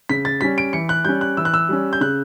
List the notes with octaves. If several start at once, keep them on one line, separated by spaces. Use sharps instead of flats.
C#3 B6
A6
G3 C#4 B6
D7
E3 C#7
F#6
G3 C#4 G6
F#6
E3 E6
F#6
E6
G3 C#4
G6
C#3 F#6